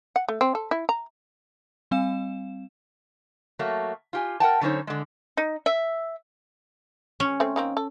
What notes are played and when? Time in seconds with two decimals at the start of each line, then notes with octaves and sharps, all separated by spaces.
0.16 F#5
0.29 A3
0.41 C4
0.55 A4
0.71 E4
0.89 A#5
1.91 G3 C4 F5 E7
3.59 F#3 A3 A#3
4.13 F4 G4 G#5
4.40 A#4 F#5 G5 A5
4.61 D3 F#3 C#4 D#4 C5 C#5
4.87 D3 G#3
5.37 D#4
5.66 E5
7.20 C#4
7.40 A3 C4 C5
7.56 D#3 A#3 C4
7.77 A4